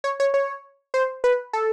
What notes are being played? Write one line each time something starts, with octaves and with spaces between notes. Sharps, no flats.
C#5
C#5
C#5
C5
B4
A4